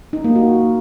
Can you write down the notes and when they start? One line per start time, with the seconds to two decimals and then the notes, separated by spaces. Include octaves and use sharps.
0.13 D#4
0.24 A#3
0.36 F#4